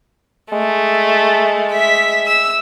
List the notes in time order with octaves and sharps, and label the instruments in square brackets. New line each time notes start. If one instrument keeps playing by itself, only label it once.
[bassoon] G#3 [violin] A3
[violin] E5 B6
E6